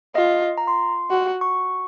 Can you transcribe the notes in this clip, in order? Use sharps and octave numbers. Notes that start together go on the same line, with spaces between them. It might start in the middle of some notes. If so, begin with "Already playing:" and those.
F4 D#5
A#5
C6
F#4
C#6